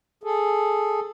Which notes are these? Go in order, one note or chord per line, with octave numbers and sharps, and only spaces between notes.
G#4 A4